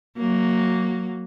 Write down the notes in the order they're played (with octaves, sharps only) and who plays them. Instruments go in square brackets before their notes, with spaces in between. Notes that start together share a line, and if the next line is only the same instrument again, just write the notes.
[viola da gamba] F#3 A#3